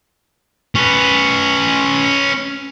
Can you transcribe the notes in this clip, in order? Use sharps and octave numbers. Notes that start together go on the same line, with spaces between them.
C#4 B4